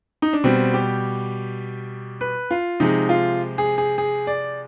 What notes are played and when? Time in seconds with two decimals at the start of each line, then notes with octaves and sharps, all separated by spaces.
0.22 D#4
0.33 D4
0.44 B2 G3 C4
0.74 G4
2.21 B4
2.51 F4
2.80 C3 F3 G#3 D#4
3.09 F4
3.58 G#4
3.78 G#4
3.98 G#4
4.27 D5